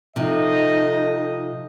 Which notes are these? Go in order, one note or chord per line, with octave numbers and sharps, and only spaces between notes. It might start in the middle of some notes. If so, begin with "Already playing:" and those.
C3 F3 D#4 A4 D#5